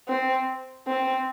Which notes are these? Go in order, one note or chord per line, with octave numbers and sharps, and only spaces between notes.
C4
C4